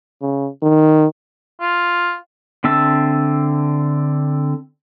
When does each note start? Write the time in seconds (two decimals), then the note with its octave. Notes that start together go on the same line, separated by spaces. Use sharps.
0.22 C#3
0.62 D#3
1.61 F4
2.64 D3 C4 E5 A5 E6